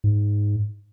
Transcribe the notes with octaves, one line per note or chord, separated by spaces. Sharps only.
G#2